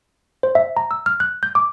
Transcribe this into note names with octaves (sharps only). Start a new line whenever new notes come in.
C5
E5
A#5
E6
F6
F#6
G6
D6